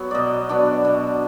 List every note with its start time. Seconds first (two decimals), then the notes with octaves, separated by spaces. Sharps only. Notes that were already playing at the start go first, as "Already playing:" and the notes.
Already playing: F#3 B3
0.11 B2 D5 D#5
0.49 F#3 B3 D4
0.85 B2